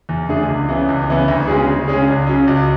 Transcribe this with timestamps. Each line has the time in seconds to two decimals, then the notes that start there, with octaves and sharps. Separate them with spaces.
0.09 E2
0.29 D3 A3 D4 G#4
0.48 C#2
0.68 C#3 E3 B3
0.88 C#2
1.08 C#3 E3 B3
1.28 D2
1.48 C#3 G#3 C#4 G#4
1.68 D2
1.88 C#3 G#3 C#4 G#4
2.08 C#2
2.27 C#3 F#3 C#4
2.47 C#2